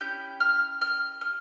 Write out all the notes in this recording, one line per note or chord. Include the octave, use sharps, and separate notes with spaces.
C#4 E4 G4 G6
F6
F6
F6